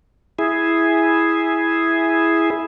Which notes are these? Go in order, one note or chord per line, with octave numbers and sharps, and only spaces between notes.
E4 G#4